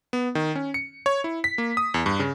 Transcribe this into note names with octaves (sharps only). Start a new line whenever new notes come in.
B3
D#3
C#4
C#7
C#5
E4
B6
A#3
D#6
E2
G2
C#3